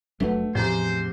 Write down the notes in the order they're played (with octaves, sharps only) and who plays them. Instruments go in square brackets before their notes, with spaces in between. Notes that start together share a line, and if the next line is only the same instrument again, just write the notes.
[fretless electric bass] F#1 F#3 D4 [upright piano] A3 [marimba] B4 F#5
[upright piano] E2 C3 A#5 [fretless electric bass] A2 [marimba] F3 [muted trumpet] C5